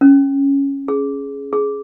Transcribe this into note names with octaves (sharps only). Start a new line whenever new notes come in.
C#4
G#4
G#4